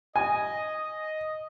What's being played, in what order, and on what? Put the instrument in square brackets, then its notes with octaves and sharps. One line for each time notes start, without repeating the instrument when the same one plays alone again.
[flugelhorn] D#5 [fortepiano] G#5